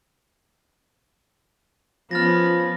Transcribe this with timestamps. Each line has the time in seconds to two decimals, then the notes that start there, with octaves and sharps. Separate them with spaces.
2.11 F3 B3 C#4 F6 A6 A#6